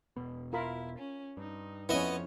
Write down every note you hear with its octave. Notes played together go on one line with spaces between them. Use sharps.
E1 B2 B3
E4 F4 A#4 B5
C#4
G2 D#4
F2 F3 B3 C#4 E4 C#5 D#5